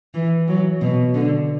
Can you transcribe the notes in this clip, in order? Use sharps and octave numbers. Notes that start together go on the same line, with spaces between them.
E3
F#3
B2
D3